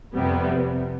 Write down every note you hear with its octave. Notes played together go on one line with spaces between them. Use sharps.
F2 C3 G3 B3